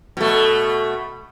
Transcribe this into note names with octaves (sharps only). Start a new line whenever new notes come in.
B2 A3